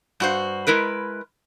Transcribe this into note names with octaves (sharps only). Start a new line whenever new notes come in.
G2 F#4 C5
G#3 E4 A#4 B4